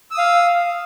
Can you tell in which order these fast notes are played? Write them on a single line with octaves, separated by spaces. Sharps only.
E6 D#6 F5